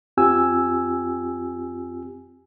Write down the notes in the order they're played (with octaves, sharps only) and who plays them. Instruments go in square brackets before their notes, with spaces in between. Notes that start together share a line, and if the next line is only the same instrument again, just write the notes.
[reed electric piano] F2 C4 F4 G4 G#5 E6